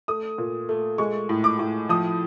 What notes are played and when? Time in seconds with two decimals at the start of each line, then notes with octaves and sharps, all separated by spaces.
0.08 A3 D#6
0.38 A#2
0.69 A3
0.98 G#3 C#6
1.29 A2
1.44 D6
1.59 A2
1.89 F3 D#6